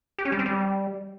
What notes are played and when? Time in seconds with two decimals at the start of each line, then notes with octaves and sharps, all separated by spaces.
0.19 G4
0.25 C#4
0.32 G3
0.39 C4
0.46 G3